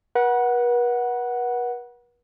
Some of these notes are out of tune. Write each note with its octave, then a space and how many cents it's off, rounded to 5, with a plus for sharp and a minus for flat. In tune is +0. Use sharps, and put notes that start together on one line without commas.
B4 -40 F#5 +0